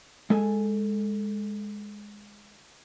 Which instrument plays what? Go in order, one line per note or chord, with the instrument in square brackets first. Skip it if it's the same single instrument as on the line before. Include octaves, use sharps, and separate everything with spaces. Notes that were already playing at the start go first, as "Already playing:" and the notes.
[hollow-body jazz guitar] G#3 A4 G#5